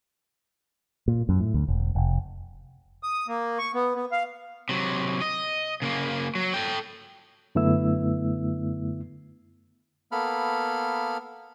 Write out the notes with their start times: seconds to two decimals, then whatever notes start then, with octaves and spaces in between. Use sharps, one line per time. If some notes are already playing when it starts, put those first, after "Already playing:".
1.08 A#2
1.29 F#2
1.40 A2
1.54 D2
1.68 E1
1.95 F1
3.03 D#6
3.28 A#3
3.59 C#6
3.74 B3
3.96 B3
4.12 F5
4.69 C3 F#3
5.22 D#5
5.82 C#3 A#3
6.35 F#3
6.54 A4 G5
7.55 F#2 D3 A3 B3 E4 E6
10.12 A#3 B3 A4 B5 F6